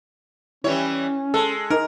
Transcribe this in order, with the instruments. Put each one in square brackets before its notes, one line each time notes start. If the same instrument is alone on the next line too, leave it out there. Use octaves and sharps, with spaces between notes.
[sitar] E3 G3 C#5 [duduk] C#4 [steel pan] E4
[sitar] G#3 [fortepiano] A4
[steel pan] D#4 [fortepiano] A#4